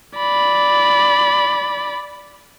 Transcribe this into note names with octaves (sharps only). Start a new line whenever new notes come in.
D5 B5